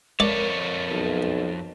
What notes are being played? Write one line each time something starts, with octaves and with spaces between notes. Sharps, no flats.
F2 A4 A#4 C#5 D5
B1